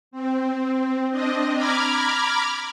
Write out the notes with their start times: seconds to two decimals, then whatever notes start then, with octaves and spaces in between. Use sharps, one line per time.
0.11 C4
1.10 C4 D4 D#5
1.55 A#5 B5 D6 F6 G#6